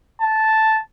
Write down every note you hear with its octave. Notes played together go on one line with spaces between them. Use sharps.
A5